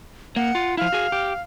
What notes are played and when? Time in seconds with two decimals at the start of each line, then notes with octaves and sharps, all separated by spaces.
0.36 A#3 F#5
0.55 F4
0.77 F3 E4 F5
0.93 F#4 G#4
1.12 G4